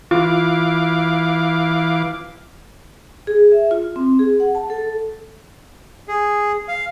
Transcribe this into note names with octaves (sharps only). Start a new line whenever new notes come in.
E3 F4 F5 D6
G#4
E5
F4
C4
G#4
F#5
A5
A4
G#4
F5